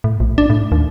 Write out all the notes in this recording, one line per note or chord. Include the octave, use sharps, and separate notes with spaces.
A2
A#1
D4
A2
D#2